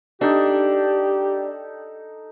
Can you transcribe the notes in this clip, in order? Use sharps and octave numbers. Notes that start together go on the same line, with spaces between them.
D4 D#4 G4 A4